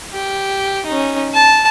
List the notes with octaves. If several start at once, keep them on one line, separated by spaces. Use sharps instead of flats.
G4
C#4 D#4
A5